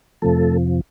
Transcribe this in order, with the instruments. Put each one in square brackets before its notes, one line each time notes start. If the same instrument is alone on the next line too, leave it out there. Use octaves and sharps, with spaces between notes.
[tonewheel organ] F2 C3 F3 A3 A4